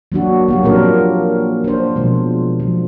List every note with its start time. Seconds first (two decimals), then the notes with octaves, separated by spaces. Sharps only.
0.12 F#3 A#3 D4 F#4
0.48 F#3 A#3 G4
0.64 A#2 F3 C4 D4 F4 A#4
1.64 D4 C5
1.96 B2 F3 G#3
2.60 F3